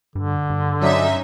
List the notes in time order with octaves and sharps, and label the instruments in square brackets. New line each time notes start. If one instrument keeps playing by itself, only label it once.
[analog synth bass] G2 [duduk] D3
[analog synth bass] G2
[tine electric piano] F#3 D5 D#6 [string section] C#4 D#4 E5